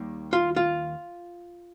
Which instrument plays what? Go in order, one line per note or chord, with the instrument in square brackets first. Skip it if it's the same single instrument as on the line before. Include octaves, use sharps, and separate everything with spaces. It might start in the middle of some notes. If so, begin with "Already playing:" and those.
Already playing: [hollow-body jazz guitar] D#2 D#3 G3 A#3
F4
F4